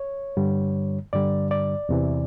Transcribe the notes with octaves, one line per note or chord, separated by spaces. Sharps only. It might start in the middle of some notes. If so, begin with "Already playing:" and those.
Already playing: C#5
G2 D3 G3
G2 D3 G3 D5
D5
E2 C3 E3